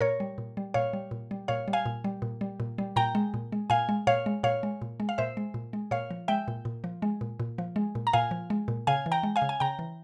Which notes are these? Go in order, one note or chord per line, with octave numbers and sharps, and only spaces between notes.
A#2 A#4 C#5
G3
A#2
G3
A#2 C#5 F5
G3
A#2
G3
A#2 C#5 F5
G3
F5 G#5
A#2
G3
A#2
G3
A#2
G3
A#2 G5 A#5
G#3
A#2
G#3
A#2 F5 G#5
G#3
A#2 C#5 F5
G#3
A#2 C#5 F5
G#3
A#2
G#3
F5
A#2 C5 E5
G#3
A#2
G#3
A#2 C#5 F5
F3
G#3 E5 G5
A#2
A#2
F3
G#3
A#2
A#2
F3
G#3
A#2
A#5
A#2 F5 G#5
F3
G#3
A#2
C#3 F5 G#5
E3
G5 A#5
G#3
F5 G#5
C#3
G#5
C#3 G5 A#5
E3